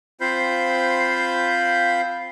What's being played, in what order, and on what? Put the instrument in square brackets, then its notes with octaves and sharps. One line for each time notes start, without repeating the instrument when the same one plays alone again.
[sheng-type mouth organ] C4 F4 C5 F5 B5 G6